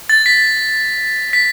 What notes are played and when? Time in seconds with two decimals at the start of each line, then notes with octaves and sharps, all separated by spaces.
0.09 A6
0.26 B6
1.33 B6